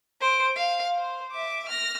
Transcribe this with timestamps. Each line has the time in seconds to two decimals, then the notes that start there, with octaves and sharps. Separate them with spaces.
0.21 C5 D7
0.56 F5
0.97 C5
1.31 E5 D6
1.68 F6 A#6